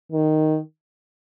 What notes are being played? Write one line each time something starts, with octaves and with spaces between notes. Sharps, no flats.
D#3